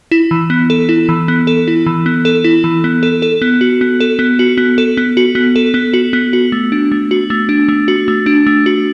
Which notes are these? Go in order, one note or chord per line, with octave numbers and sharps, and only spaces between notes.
E4
E3
B3
A4
E4
E3
B3
A4
E4
E3
B3
A4
E4
E3
B3
A4
A4
B3
F#4
B3
A4
B3
F#4
B3
A4
B3
F#4
B3
A4
B3
F#4
B3
F#4
A3
D4
A3
F#4
A3
D4
A3
F#4
A3
D4
A3
F#4